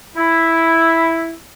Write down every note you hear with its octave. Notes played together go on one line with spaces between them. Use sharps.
E4